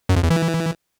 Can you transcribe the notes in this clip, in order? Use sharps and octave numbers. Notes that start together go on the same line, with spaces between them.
F#2
F2
E2
E3